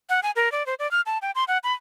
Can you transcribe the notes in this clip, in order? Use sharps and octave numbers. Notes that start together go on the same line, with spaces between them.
F#5
G#5
A#4
D5
C5
D5
F6
A5
G5
C6
F#5
B5